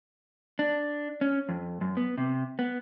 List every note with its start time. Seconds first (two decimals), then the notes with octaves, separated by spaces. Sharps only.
0.59 D4
1.21 C#4
1.49 F2
1.81 F#2
1.97 B3
2.18 C3
2.59 B3